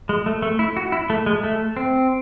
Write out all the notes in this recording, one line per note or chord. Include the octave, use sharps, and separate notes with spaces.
G#3
A3
A3
E4
F#4
E4
A3
G#3
A3
C4